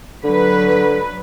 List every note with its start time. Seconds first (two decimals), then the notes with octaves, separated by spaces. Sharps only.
0.24 D3 F#3 B4